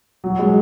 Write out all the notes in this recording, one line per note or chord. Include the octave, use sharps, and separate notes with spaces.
F#3
G#3